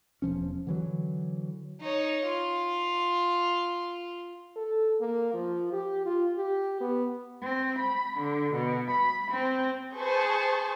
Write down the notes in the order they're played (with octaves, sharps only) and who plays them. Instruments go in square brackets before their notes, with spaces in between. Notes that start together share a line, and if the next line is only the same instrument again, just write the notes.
[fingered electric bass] E1 F3 C#4
D3 E3 F#3
[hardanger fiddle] D#4 C#5
F4
[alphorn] A4
A#3
F3
G4
F4
G4
B3
[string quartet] C4
B5
D3
B2
B5
C4
[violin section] G#4 B4 C5 A5 C#6